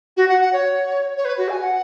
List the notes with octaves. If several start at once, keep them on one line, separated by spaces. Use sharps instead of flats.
F#4
F#5
F#5
C#5
C#5
B4
F#4
G#5
F#5